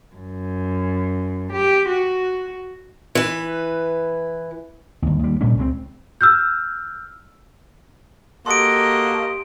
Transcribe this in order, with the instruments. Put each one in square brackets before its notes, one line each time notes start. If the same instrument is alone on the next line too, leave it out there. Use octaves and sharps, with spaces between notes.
[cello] F#2
G4
F#4
[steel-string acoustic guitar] E3 B4
[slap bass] G1 D#2
D#2 G3
A#2 G3 A3 C#4
C#2 C#3 G#3 C4
[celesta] E6 F6 G6
[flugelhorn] A#3 [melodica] F#4 A4 [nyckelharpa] G4 D#5 [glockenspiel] C6 D7